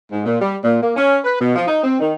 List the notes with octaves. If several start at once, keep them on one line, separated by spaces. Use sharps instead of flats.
G#2
A#2
G3
A#2
A#3
C#4
B4
B2
F3
D#4
C4
D#3